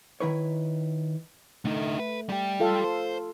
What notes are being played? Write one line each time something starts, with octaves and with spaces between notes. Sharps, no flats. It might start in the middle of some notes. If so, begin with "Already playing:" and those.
D#3 E4 B4 C#5
D3 A3 D#4
B4
G3 G4
F4 A4 F5
C5